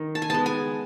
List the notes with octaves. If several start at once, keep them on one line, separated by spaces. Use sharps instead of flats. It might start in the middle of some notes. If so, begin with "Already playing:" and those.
Already playing: D#3
A5
G#5
G#3 B3 A5
G#5